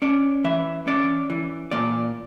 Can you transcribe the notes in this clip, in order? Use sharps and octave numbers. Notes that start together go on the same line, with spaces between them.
C#4 D5
E3 E5
C#4 D5
E3
A#2 D5